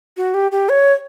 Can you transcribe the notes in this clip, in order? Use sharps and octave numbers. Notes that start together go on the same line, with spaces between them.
F#4
G4
G4
C#5